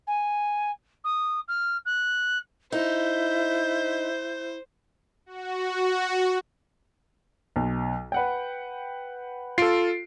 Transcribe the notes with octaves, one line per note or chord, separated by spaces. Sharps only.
G#5
D#6
F6
F#6
D#4 E4 C5 G6
F#4
B1
B4 F#5 G5
F4 A4 C7 D7